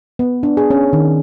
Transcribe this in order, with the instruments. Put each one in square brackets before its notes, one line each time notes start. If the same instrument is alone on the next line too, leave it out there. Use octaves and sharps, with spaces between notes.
[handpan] B3
D4
G#4
C#4
D#3